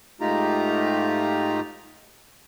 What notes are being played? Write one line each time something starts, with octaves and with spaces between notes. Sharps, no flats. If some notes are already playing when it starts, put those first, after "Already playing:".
G#2 A3 D#4 F4 G4 A#5